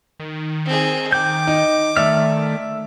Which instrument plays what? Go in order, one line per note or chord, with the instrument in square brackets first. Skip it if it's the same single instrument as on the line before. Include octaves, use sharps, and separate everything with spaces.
[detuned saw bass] D#3
[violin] C4 G#4
[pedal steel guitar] G5 G6 [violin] D6
[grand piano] D#4
[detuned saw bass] D#3 [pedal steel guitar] A3 D5 F6 [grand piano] E5